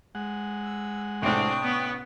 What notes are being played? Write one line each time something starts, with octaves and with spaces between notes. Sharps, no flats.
G#3 F#5
E6
C2 A2 C4 D4 G5 C#6 D#6
B3 C#4